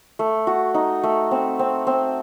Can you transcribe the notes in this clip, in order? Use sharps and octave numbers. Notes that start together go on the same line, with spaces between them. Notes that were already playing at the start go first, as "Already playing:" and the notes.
A3
F#4
D#4
A3
C4
C4
C4